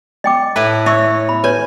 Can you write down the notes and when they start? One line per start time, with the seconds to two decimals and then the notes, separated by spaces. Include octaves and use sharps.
0.24 D#5 G5 D6
0.56 A2 E4 B4
0.86 C#5 E5 C#6 E6
1.29 B5
1.44 B4 C#5 G#5